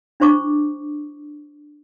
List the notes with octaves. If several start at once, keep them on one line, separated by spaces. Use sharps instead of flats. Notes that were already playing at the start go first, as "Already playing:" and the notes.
D4 E4 C5 C#6 D6